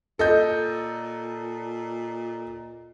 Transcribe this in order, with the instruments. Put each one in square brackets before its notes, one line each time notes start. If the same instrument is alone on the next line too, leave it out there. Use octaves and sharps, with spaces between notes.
[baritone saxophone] A#2 [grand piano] A4 D#5 G6